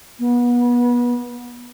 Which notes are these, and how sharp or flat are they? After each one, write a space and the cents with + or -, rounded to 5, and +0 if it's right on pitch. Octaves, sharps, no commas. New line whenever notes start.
B3 -30